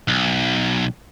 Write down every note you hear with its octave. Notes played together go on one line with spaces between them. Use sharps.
B1